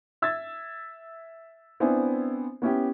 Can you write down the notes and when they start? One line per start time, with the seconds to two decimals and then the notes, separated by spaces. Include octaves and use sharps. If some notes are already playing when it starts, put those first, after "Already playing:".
0.22 E5 E6 G#6 A6
1.80 B3 C4 D4 E4 C5 G#5
2.62 B3 C#4 E4 G4